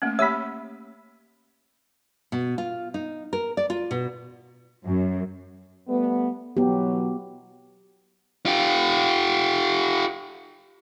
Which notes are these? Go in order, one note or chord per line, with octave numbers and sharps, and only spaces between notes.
A3 A#3 C#4
A#3 G4 C#5 E5 B5
B2
F4
D#4
A#4
D5
F4
B2
F#2
G3 A3 B3
B2 E3 F#3 B3 G4
F4 G4